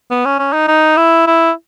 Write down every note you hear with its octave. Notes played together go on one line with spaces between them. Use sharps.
B3
C#4
C#4
D#4
D#4
E4
E4